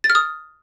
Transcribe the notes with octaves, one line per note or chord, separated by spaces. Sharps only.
A6
F6
D#6